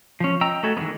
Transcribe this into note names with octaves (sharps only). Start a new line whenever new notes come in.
F3 C#4
D#5 G5 A#5 E6
A3 F#4 A4 G#5
D#3 E3 G3 G#3 B3